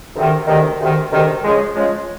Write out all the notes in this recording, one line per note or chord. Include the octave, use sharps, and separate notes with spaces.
D2 C3 D#3
D2 C3 D#3
D2 C3 D#3
D2 C3 D#3
C#3 F3 G#3
C#3 F3 G#3